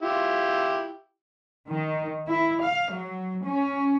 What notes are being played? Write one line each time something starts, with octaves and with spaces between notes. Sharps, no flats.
E4 F4 G4
D#3
E4
F5
F#3
C#4